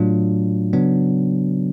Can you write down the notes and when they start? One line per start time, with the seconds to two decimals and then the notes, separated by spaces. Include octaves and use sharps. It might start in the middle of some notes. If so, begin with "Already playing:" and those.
Already playing: A2 F#3 A3 D4 F4
0.73 C#3 F#3 B3 D4